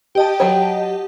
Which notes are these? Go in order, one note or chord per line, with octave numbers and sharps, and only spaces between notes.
G4 D#5 G5 A5
F#3 C#5